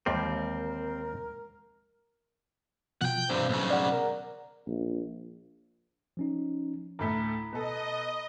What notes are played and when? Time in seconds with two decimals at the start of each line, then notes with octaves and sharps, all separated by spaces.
0.06 D#2 E3 F3 G3 G#3 C4 A#4
3.01 B2 F3 F#5 G5
3.30 G2 C3 C5
3.49 B1 A#2 C#3
3.70 D5 F#5
3.92 A#4
4.67 A#1
6.17 F3 C#4 D#4
6.99 D2 A2 A3 A#5 B5 B6
7.52 B2 A4 D#5